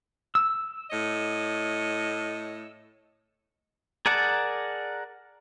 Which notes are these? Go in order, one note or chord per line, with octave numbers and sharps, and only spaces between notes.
E6
A2 C#5 D#5
G#4 A#4 D5 F#5 A5